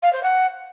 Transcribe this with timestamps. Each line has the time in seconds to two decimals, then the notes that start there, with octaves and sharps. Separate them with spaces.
0.02 F5
0.12 C5
0.23 F#5